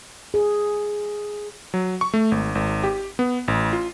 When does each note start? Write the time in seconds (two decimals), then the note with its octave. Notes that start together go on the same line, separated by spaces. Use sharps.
0.34 G#4
1.74 F#3
2.01 C#6
2.14 A3
2.32 G#1
2.55 G#1
2.83 G4
3.19 B3
3.48 A1
3.73 F4